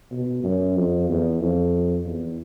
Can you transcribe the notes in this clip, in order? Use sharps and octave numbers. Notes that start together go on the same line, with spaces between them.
B2
F#2
F2
E2
F2
E2